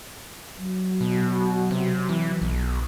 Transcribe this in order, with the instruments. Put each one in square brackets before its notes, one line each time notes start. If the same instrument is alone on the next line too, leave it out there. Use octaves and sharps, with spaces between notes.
[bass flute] F#3
[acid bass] B2
C3
E3
B1